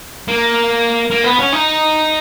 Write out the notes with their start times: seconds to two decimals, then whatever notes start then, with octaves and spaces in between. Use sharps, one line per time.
0.28 A#3
1.11 A#3
1.24 B3
1.39 C#4
1.53 D#4